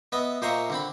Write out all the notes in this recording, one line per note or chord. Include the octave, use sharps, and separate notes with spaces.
B3 D#5 E5
A#2 C5 D#5 E5 A#5 C#6
D3 C4 B5